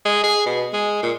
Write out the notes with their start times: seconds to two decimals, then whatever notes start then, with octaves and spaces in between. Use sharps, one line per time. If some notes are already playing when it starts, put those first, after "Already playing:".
0.05 G#3
0.24 G#4
0.46 B2
0.73 G#3
1.03 A#2